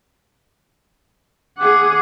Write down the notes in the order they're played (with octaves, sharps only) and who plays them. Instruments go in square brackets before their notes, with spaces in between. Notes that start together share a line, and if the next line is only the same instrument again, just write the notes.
[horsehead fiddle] G#4 F#5 [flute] D6